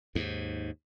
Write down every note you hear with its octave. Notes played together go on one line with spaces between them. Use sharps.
D#2 G#2